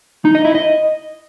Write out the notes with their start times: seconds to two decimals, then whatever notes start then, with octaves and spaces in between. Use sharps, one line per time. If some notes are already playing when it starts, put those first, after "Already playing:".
0.25 D#4
0.35 D#5
0.45 E4
0.55 D#5